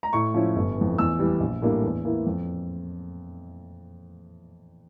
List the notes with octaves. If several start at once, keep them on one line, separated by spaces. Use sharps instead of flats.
A#5
A2 C#6
F3 C#4 E4
G1
F2 E3
E2 E6
E3 G3
A#1
A2 G3 A#3 D4
E2
E3 A#3 E4
F2